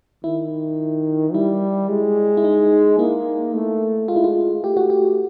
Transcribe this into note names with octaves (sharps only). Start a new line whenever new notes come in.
D#3 E4
G3 E4
G#3
E4
D#4
A#3 E4
A3
G#3 F4
E4
F4
A3 G4
F#4
G4